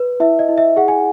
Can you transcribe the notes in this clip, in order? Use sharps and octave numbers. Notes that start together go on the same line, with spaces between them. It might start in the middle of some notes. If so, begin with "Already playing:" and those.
Already playing: B4
E4 E5
D#5
E4
E5
G#4 F#5
G#5